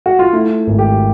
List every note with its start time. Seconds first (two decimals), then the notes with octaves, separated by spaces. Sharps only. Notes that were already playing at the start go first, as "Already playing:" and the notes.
0.06 F#4
0.19 F4
0.33 A3 E4
0.67 G#1
0.79 G4